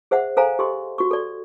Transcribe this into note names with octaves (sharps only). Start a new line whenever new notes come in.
G#4 C5 E5 F#5
A4 C5 F5 G#5 A#5
G4 A4 D#5 C6
F#4 C#6
A4 D5